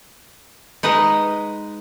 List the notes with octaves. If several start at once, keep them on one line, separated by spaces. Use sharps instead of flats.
G#3 D#4 B4 D#5